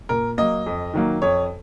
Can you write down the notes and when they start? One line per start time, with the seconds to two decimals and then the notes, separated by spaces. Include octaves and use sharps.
0.09 A#2 A#4
0.38 F#3 A#3 D#5
0.66 F2
0.94 D#3 F#3 A#3
1.22 F2 C#5